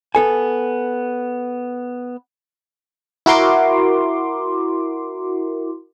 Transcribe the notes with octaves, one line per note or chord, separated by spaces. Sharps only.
B3 A4 G#5
E4 F#4 A#4 C6 D6